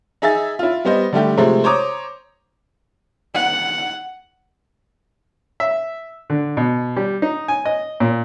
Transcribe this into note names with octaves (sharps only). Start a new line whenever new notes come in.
D#4 G#4 E5 G#5 A6
E4 F4
G3 B3 C5 D#5
D3 G3 A3 G4
C3 F3 G#3 A3 C4
C5 C#5 A#5 D6 D#6
F#5
E5
D3
B2
G3
D#4
G#5
D#5
A#2